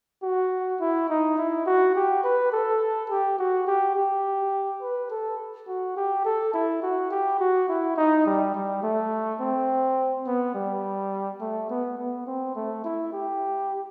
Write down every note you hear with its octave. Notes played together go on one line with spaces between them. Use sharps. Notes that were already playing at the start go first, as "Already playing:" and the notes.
F#4
E4
D#4
E4
F#4
G4
B4
A4
G4
F#4
G4
G4
B4
A4
F#4
G4
A4
E4
F#4
G4
F#4
E4
D#4
G3
G3
A3
C4
B3
G3
A3
B3
B3
C4
A3
E4
G4